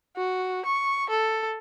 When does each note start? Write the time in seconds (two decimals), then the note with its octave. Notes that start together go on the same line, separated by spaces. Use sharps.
0.17 F#4
0.66 C#6
1.10 A4